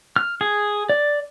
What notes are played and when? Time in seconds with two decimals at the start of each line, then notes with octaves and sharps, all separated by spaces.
0.16 F6
0.41 G#4
0.89 D5